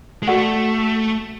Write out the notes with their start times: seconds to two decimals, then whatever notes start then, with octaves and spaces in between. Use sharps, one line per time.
0.23 G#3
0.27 A3 F#4 A4 D5 F#5 C#6